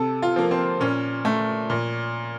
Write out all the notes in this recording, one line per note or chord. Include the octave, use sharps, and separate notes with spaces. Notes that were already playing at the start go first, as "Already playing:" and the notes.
Already playing: C3 A4
F4
F3 A#3
C4
A#2 C#4
A3
A#2